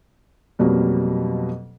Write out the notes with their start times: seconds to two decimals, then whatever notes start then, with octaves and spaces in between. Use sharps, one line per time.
0.59 F2 B2 F#3 G3 A#3